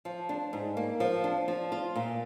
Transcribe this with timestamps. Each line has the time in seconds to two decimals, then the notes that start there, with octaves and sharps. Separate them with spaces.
0.05 F3
0.29 D4
0.53 G#2
0.77 A#3
1.00 F3
1.24 D4
1.48 F3
1.72 F4
1.96 A#2